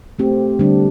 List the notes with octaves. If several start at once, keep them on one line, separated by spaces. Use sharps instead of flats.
A3 C4 G4
D3 G3 D4